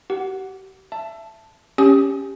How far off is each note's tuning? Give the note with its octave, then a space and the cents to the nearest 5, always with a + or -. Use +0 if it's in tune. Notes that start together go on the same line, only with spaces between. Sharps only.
G4 -40 A#4 +0 F#5 +0
E5 +20 A5 +0
C#4 +0 G4 +10 D#6 +20